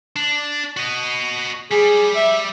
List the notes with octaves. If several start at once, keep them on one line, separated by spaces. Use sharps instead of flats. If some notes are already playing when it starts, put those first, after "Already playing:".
D4
F#4 D#5
G3 G#4
E5